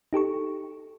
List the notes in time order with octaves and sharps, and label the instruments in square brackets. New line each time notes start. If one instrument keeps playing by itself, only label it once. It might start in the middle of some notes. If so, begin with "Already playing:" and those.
[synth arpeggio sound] D#4 G4 A4 C#6